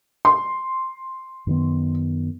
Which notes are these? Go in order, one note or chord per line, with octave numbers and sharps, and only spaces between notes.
C6
F#2 D#3 B3